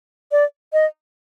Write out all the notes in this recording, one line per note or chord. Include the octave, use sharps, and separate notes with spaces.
D5
D#5